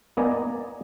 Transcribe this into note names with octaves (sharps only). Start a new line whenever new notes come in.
A#3 B3 D5 D#5 G#5 A#5